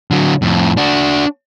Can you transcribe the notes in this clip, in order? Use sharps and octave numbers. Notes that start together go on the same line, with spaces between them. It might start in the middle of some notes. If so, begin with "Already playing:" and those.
D3 F#3
F2 A2
D4 F#4